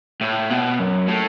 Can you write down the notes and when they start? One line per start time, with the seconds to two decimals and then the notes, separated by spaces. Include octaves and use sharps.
0.21 A2
0.50 B2
0.79 F#2
1.08 A2